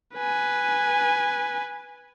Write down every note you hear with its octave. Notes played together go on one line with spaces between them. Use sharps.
B4 G#5